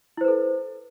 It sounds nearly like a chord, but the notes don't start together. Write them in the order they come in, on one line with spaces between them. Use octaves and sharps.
E4 C5 B4 A4